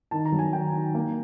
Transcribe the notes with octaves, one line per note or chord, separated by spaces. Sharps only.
D#3 A5
A#5
F#3
G#5
D#3 G5
D#3
A#3